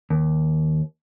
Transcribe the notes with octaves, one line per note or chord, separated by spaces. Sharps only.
D#2